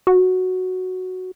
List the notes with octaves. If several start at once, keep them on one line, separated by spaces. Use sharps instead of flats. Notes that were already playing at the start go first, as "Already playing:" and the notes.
F#4